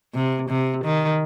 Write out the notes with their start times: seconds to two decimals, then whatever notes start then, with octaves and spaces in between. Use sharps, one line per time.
0.14 C3
0.49 C3
0.84 D#3